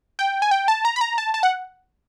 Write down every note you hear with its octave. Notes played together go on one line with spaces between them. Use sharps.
G5
G#5
G5
A5
A#5
B5
A#5
A5
A5
F#5